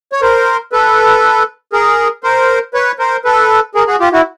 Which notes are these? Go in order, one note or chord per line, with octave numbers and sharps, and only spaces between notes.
C#5
A#4 C5
A4 B4
G#4 A#4
A#4 C5
B4 C#5
A#4 C5
A4 B4
G#4 A#4
F#4 G#4
F4 G4
E4 F#4